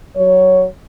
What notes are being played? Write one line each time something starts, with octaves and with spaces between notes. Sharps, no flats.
F#3 C#5